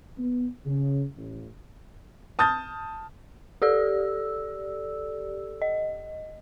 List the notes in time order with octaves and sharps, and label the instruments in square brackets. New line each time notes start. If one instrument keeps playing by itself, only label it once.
[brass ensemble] B3
C#3
A1
[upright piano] A5 D#6 F6 G6 A6
[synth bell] G4 A4 D5 E6
D#5